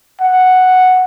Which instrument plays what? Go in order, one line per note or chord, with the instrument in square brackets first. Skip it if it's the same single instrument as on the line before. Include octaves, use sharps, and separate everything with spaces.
[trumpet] F#5